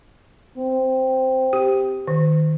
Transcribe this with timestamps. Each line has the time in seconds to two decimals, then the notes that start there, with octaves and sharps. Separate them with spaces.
0.57 C4
1.53 G4
2.07 D#3